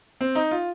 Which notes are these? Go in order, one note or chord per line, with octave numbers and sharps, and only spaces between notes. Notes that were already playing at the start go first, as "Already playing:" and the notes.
C4
D#4
F4